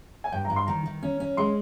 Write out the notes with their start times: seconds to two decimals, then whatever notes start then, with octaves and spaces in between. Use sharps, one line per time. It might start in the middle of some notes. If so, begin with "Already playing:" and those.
0.24 G#5
0.32 G2 G5
0.45 A#5
0.50 G2
0.56 C6
0.67 D#3 A#5
0.86 D#3
1.03 C#4
1.20 C#4
1.37 G#3 C6